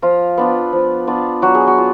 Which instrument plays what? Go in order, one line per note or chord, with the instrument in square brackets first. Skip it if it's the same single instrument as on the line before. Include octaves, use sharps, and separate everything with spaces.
[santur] F3 F4
B3 D4 F4
F3
B3 D4 F4
F#3 F#4
G#4
F#4
F4